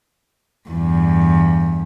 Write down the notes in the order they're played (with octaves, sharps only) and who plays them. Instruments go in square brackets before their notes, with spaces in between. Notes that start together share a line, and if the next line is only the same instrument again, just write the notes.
[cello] E2 G2